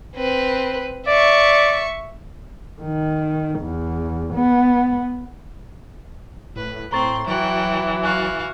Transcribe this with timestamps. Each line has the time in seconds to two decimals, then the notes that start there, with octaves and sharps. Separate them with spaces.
0.16 C4 B4
1.07 D5 E5 C#6
2.82 D#3
3.60 E2
4.34 B3
6.56 A2 B4
6.92 A2 C4 A#5 C6 C#6 A6
7.28 E3 F#3 F#5 G5
8.03 F#4 F5 G#5 C#6 F#6